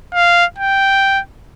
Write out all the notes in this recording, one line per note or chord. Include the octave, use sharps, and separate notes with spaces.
F5
G5